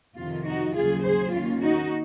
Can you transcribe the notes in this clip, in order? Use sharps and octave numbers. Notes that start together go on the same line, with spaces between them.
F2 C3 D#3 F4
D#4 F#4
D#2 C#3 F#3 F4 G#4
G#4 C5
D#2 D#3 A#3 C#4 F4
D#4 F#4